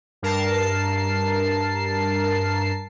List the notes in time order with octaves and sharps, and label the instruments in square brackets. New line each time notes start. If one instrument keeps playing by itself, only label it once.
[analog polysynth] G2 A#4 A5 C7